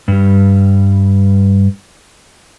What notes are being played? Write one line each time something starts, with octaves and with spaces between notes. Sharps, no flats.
G2 G3